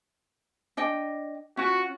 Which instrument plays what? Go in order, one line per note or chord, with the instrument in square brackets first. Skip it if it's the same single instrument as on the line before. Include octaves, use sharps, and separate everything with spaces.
[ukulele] D4 D#5 G5
[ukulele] C#4 F4 [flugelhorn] F#4